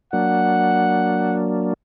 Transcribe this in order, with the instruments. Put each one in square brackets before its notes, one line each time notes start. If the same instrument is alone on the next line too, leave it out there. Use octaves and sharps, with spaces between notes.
[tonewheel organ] F#3 A#3 D4 [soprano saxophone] F#5